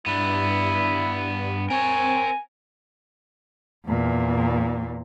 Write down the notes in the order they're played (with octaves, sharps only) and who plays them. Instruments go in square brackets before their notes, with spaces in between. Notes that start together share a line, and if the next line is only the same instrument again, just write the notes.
[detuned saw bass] G2 [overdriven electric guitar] B3 D4 [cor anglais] E4
[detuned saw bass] C4 [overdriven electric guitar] A#4 C#5 [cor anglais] G#5
[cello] E2 A#2